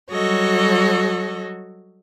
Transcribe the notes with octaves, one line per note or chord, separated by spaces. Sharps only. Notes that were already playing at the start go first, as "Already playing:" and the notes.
F#3 G3 F#4 A4 C#5 D#5